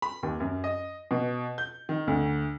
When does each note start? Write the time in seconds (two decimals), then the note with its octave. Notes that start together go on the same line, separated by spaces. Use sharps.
0.02 B5
0.23 D#2
0.40 F#2
0.64 D#5
1.11 B2
1.58 G6
1.89 D#3
2.07 D2